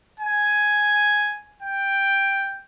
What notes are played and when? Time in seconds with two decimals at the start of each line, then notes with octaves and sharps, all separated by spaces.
0.20 G#5
1.62 G5